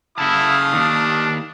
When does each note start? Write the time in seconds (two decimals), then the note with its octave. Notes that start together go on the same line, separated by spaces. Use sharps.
0.18 C#3 A3 E4 F5 A5 D#6
0.73 D#2 D4